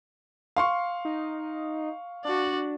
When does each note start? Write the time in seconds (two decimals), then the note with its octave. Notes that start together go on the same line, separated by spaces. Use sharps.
0.56 F5 C6 C#6
1.05 D#4
2.25 D4 F#4 D5